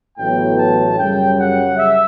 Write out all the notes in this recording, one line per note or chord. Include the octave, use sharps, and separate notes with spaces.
A1 A2 F#3 B3 G5
A5
F#2 C#3 G3 G5
F#5
E5